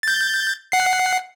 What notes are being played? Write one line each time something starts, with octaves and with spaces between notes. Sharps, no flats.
G6 A6
F#5 C7